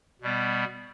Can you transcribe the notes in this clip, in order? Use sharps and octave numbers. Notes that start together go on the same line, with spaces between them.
B2 G3 B3